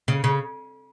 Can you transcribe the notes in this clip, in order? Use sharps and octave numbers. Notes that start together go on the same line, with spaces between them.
C#3
C#3